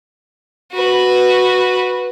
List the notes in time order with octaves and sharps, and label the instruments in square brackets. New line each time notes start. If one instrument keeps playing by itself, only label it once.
[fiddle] F#4 B4